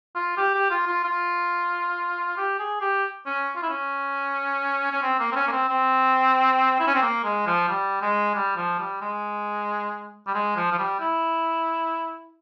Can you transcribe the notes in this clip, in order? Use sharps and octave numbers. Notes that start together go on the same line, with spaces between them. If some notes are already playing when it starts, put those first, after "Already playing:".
F4
G4
G4
F4
F4
F4
G4
G#4
G4
C#4
F4
E4
C#4
C#4
C4
A#3
C4
C#4
A#3
C4
C4
E4
C#4
C4
A#3
G#3
F3
G3
G#3
G3
F3
G3
G#3
G3
G#3
F3
F3
G3
E4